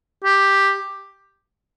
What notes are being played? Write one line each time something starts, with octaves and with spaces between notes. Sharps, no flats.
G4